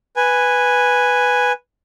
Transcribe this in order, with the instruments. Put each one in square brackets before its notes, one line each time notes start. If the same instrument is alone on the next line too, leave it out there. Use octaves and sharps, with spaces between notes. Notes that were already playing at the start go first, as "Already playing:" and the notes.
[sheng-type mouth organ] B4 G#5